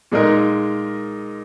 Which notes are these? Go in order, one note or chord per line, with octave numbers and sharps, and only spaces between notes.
A#2 G#3 D#4 A#4